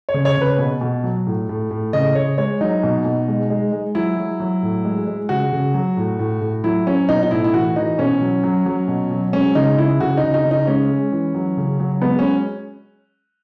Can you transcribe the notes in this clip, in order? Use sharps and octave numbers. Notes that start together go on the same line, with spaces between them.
C#5
C#3
C#5
C#3 B4
B2
B2
F#3
A2
A2
A2
C#3 D#5
C#3 C#5
G#3 C#5
F#3 D#4
B2
B2
G#3
G#3
G#3
F#3 E4
F#3
F#3
A2
G#3
G#3
C#3 F#4
C#3
F#3
A2
A2
A2
F#3 E4
F#3 C#4
B2 D#4
D#4
A2 E4
E4
E3 F#4
E3 D#4
B2 C#4
F#3
F#3
F#3
B2
F#3
G#3 C#4
C#3 D#4
C#3 E4
C#3 F#4
D#4
C#3
D#4
C#3
D#4
G#3 C#4
G#3
E3
F#3
C#3
F#3
G#3 B3
C#4